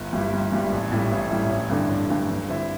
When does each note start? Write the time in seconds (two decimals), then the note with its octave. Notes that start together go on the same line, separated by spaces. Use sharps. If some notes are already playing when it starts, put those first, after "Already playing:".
Already playing: G1
0.13 G2 G3 E4
0.33 G1
0.52 G2 G3 E4
0.72 A1
0.92 A2 G3 E4
1.12 A1
1.30 A2 G3 E4
1.50 A1
1.70 G2 D3 A3 D4
1.89 A1
2.09 G2 D3 A3 D4
2.29 G2
2.48 D3 C4 E4